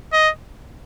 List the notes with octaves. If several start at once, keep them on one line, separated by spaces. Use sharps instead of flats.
D#5